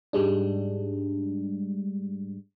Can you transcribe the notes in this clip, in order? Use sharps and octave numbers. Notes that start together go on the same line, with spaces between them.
G#2 G3 G#3 D4